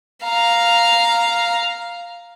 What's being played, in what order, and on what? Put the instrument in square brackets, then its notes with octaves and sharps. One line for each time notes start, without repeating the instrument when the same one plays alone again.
[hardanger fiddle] F5 A#5